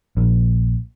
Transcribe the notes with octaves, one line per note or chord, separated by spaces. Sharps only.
A#1